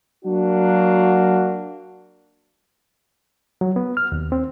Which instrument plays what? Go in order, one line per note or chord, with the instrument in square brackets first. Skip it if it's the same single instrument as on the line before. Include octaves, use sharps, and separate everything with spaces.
[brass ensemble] F#3 A#3 D4 F#4
[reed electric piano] F#3
B3
F6
D#2
C4